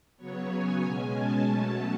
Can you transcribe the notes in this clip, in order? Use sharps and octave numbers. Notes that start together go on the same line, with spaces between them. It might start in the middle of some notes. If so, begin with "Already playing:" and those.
C#3 F#3 B3 C#5
G#5
B2 G#3 C#4
A5
B2 F#3 A3 C#4 A5